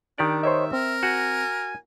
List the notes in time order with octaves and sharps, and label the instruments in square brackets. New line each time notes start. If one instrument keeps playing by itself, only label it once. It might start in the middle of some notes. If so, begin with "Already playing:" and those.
[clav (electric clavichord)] D#3 G4 D5 [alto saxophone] D4
[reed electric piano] C5 C#5 D#5 [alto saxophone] E5
[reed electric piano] C4 [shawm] A#4
[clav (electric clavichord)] F#4 [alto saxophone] G#5